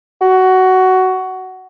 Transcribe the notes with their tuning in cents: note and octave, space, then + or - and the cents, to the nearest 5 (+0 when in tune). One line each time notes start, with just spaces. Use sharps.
F#4 +15